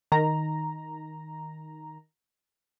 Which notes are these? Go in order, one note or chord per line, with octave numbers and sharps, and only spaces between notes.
D#3 A#5